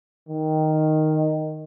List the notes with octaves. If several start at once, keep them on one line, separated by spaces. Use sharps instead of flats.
D#3